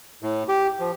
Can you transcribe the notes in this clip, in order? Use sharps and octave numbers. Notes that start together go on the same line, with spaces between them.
A2
G4
F3